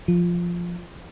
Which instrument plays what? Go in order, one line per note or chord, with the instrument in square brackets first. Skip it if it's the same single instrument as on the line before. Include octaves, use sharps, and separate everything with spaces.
[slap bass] F3